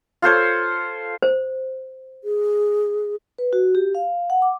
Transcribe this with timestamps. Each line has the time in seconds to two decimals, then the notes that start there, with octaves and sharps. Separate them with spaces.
0.22 F4 A4 C5 C#5
1.22 C5
2.24 G#4
3.38 B4
3.53 F#4
3.75 G4
3.95 F5
4.30 F#5
4.42 D6